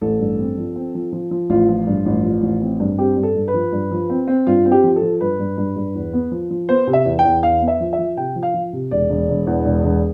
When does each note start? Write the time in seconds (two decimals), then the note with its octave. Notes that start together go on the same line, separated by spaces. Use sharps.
0.01 A1 A4
0.20 G2
0.39 C4
0.58 F3
0.76 C4
0.95 F3
1.13 F3
1.31 F3
1.50 A1 F4
1.69 F3
1.87 G2
2.05 A1
2.24 F3
2.43 A1
2.61 C4
2.80 G2
2.98 C4 G4
3.17 G2
3.23 A4
3.36 G2
3.48 B4
3.54 F3
3.73 G2
3.91 F3
4.10 C4
4.28 C4
4.47 G2 F4
4.65 C4
4.72 G4
4.84 F3
4.96 A4
5.02 F3
5.21 G2 B4
5.39 G2
5.58 G2
5.76 G2
5.95 E2
6.13 B3
6.32 F3
6.51 F3
6.69 B3 C5
6.87 C3
6.93 E5
7.06 E2
7.19 G5
7.25 E2
7.43 E2 F5
7.62 B3
7.68 E5
7.80 F3
7.93 E5
7.99 F3
8.17 C3 G5
8.36 F3
8.43 F5
8.54 F3
8.73 C3
8.91 E1 D5
9.10 E1
9.29 E1
9.47 E2
9.65 E1
9.84 E1